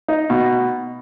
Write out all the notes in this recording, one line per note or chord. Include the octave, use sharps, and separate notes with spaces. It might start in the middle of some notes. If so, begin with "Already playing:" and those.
D#4
B2